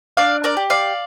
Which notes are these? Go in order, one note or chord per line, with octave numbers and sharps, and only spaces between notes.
D4 D5 F5
A#4 D5
G4
D5 F5